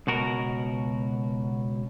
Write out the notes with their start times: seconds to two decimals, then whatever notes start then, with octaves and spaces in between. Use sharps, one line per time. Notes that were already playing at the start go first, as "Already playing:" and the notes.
0.07 C#2 B2 F#4 A#4